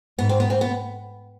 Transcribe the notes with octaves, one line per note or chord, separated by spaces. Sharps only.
G#2 B3
C4
B3
C4
B3